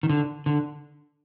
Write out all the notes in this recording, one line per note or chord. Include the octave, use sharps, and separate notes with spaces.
D#3
D3
D3